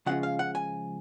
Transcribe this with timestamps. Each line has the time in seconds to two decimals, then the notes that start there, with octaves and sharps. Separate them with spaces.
0.06 C#3 F3 G#3 C#4 F4 F#5
0.23 F5
0.39 F#5
0.55 G#5